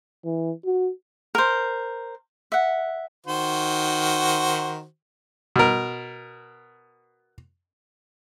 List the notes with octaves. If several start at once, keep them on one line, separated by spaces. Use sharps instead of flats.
E3
F#4
A#4 C5
E5 F#5
D#3 F#4 C5
B2 A#4